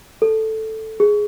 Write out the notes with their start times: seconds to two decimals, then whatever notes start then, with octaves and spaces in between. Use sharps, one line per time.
0.22 A4
1.00 G#4